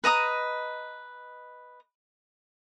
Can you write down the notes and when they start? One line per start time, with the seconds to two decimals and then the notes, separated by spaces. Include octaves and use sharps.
0.04 B4 D#5 A#5 D#6